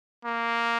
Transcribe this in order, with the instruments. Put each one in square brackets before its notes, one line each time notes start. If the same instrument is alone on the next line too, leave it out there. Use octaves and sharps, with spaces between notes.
[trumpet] A#3